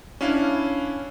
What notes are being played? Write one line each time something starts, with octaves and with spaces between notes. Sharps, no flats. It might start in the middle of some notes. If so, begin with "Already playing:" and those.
C#4 D4 E4 F5